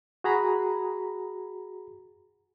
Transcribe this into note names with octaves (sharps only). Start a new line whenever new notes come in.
F#4 G#4 A#5 B5